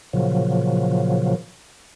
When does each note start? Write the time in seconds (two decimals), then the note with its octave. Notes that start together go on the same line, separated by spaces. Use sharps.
0.13 A#2 C#3 F3 F#3